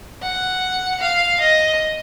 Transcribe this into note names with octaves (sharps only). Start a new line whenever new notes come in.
F#5
F5
D#5